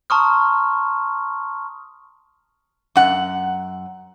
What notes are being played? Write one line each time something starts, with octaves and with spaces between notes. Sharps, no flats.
A5 A#5 C6 C#6 D#6 F6
F#2 F#5